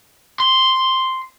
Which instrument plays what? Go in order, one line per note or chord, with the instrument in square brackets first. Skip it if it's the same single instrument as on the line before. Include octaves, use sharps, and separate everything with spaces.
[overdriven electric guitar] C6